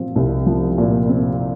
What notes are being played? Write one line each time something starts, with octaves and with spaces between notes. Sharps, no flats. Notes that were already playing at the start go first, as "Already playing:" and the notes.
Already playing: A#2 F3 C4
C2
F3
A#2
C4